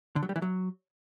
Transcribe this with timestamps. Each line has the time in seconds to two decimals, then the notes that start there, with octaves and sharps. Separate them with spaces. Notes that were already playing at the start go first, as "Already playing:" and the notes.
0.16 D3
0.23 F#3
0.29 G3
0.36 E3
0.42 F#3